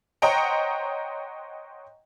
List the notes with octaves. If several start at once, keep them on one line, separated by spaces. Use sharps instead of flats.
C5 C#5 D#5 F#5 G5 A#5